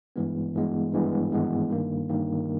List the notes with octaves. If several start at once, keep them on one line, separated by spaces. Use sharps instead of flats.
G#1 G2 E3 G#3 B3
G#1 G2 E3 G#3 B3
G#1 G2 E3 G#3 B3
G#1 G2 E3 G#3 B3
G1 G2 D#3 A#3
G1 G2 D#3 A#3